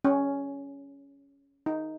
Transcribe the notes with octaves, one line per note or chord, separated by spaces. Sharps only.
C#4
D#4